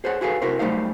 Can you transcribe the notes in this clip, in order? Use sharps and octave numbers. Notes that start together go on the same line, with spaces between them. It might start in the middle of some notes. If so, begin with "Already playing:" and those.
G#4 C5 C#5 F#5
E4 F#4 G#4 A4 B4 F5
C3 E4 F#4 A#4 C5
F#3 G3 A3 D#4 C5 F5